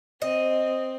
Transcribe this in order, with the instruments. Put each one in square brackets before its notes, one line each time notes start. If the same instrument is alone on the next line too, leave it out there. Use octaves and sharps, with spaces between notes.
[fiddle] C4 [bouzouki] D#5